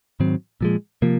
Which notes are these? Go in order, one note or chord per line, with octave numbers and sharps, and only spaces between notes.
G#2 D#3 F#3 C4
A#2 F3 G#3
C3 F3 A#3